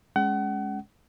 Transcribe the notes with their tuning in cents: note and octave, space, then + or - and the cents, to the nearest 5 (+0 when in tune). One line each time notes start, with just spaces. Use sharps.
G#3 +0 C#4 +0 F#5 +35